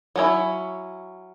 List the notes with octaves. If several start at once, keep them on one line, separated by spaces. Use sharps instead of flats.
F#3 C#4 E4